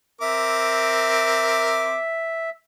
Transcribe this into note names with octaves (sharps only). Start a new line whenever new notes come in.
C4 A#4 E5 D6